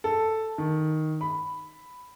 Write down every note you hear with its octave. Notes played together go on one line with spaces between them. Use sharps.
A4
D#3
B5